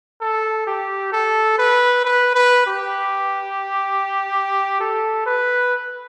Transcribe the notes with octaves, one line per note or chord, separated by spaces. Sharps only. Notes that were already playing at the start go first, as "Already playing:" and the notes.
A4
G4
A4
B4
B4
B4
G4
A4
B4